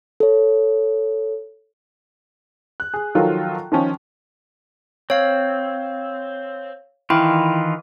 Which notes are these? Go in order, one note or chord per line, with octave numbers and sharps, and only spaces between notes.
A4 C#5
F#6
G#4
D#3 F3 F#3 F4 A4 A#4
D#3 F3 C#4
C4 C#5 F5
D#3 E3 E4 F4 G5